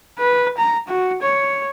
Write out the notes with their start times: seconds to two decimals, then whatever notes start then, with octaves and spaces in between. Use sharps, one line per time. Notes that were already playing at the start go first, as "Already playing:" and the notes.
0.19 B4
0.57 A#5
0.88 F#4
1.22 C#5